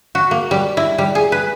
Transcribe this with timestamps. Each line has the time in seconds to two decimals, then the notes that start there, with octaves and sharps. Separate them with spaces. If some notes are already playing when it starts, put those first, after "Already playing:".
0.15 F#4
0.31 A#3
0.51 G3
0.77 E4
0.98 G3
1.15 G#4
1.32 B4